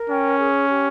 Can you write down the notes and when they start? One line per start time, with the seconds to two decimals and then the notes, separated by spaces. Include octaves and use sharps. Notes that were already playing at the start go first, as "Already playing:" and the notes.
Already playing: A#4
0.09 C#4 G5
0.39 G#4
0.69 G4